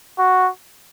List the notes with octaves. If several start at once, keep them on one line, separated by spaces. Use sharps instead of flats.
F#4